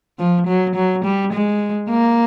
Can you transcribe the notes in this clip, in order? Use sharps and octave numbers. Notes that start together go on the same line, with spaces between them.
F3
F#3
F#3
G3
G#3
A#3